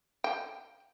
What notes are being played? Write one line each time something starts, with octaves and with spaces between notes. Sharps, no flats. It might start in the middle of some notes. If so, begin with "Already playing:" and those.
G5